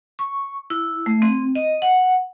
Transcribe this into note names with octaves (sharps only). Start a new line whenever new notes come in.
C#6
E4
A3
C4
D#5
F#5